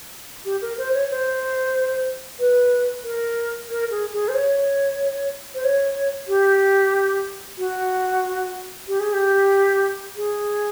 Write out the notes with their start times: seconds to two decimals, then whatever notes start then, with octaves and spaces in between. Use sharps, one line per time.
0.45 G4
0.62 A#4
0.78 C5
0.94 C#5
1.11 C5
2.39 B4
3.04 A#4
3.70 A#4
3.91 G#4
4.13 G#4
4.28 C5
4.34 C#5
5.55 C5
5.64 C#5
6.28 G4
7.58 F#4
8.88 G4
9.00 G#4
9.13 G4
10.17 G#4